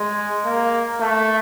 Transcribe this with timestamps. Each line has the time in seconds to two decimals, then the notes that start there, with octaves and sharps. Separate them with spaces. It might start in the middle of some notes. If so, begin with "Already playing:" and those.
Already playing: G#3
0.45 A#3
1.00 A3